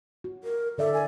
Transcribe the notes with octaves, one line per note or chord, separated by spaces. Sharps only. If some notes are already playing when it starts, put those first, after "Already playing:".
F#4
A#4
D3 A4 D5 E5
G#5